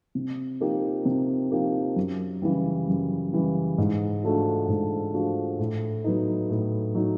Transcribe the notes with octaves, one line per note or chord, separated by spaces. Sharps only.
C3
F3 A#3 D#4 G4
C3
F3 A#3 D#4 G4
F#2
C#3 E3 G3
F#2
C#3 E3 G3
G#2
F3 A3 D4 F#4
G#2
F3 A3 D4 F#4
A2
F#3 B3 D#4
A2
F#3 B3 D#4